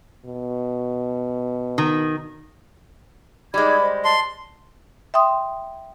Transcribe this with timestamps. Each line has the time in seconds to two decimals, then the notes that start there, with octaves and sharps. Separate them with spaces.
0.25 B2
1.78 D#3
3.54 G3 G#3 D#4 B5 D6 G#6
3.80 C5 D#5
4.04 A5 C6
5.14 E5 G5 C6 D#6